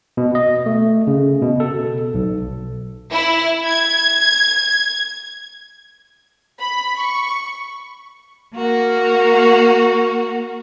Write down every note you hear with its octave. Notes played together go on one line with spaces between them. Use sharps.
B2
D#5
A3
C#3
B2
A4
B1
E4
G#6
B5
C#6
A#3 F#4 A#4